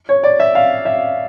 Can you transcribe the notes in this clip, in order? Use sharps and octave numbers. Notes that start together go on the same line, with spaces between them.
C#5
D5
E5
F5
E5